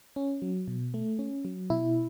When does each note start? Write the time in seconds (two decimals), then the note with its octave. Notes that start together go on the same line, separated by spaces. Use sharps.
0.16 C#4
0.42 F#3
0.68 B2
0.94 A3
1.19 C#4
1.45 F#3
1.70 B2 E4